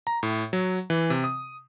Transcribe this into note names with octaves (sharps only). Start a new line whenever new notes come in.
A#5
A2
F#3
E3
C3
D#6